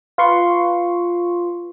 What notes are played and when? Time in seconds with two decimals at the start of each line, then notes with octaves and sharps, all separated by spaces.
0.18 F4 B4 C6 C#6